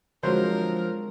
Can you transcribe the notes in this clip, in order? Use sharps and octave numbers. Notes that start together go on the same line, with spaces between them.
D3 F3 F#3 G#3 C4 A#4 C5